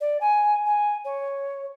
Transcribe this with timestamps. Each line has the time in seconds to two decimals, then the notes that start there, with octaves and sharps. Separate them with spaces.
0.01 D5
0.21 G#5
0.66 G#5
1.05 C#5